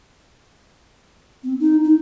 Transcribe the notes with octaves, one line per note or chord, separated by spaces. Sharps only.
C4
D#4
D#4